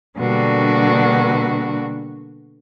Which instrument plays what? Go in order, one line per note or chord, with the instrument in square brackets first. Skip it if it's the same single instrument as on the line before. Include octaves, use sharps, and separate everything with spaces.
[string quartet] B2 D3 G3 A#3 D4 F#4